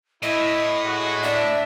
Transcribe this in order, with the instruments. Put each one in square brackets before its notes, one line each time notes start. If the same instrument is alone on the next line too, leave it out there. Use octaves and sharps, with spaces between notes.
[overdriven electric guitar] A2 [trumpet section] E4 [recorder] D#5
[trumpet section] G#3 F#4
[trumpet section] D4 [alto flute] D5 [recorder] E5